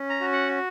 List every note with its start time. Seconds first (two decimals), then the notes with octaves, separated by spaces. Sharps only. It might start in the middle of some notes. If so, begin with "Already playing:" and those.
Already playing: C#4
0.10 A#5
0.21 F#4
0.32 F#5